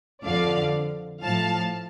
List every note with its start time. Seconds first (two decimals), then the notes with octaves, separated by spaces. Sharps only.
0.24 F2 D3 F3 D5 F5
1.23 A2 F3 F5 A5